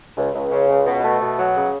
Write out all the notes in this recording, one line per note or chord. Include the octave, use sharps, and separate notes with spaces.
C#2
C#2
C#3
C#2
B2
A3
B2
F#3
C#3